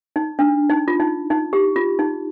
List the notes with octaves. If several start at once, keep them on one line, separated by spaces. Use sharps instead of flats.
D#4
D4
D#4
F4
D#4
D#4
G4
F4
D#4